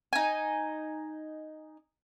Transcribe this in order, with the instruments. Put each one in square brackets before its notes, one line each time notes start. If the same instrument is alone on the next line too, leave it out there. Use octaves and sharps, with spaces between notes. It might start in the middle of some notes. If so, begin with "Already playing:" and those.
[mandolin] D#4 G#5